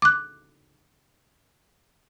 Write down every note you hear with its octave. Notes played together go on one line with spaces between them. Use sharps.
D6 F#6